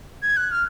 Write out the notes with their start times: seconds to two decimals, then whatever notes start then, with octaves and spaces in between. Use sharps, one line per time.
0.23 G#6
0.37 F#6
0.51 F6